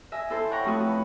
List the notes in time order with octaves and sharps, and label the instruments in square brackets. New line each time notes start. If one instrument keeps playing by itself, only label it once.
[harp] D#5 E5 G#5
E4 A4 C5
C#5 F#5 G5 A#5 C#6
F2 A3 E4 F#4 D#6
B4